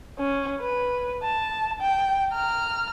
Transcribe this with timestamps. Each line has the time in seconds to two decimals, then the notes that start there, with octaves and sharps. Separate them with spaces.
0.19 C#4
0.61 B4
1.23 A5
1.81 G5
2.32 A#5 F6